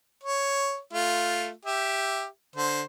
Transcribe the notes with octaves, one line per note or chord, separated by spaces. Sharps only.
C#5
A3 F4
G4 E5
D3 C5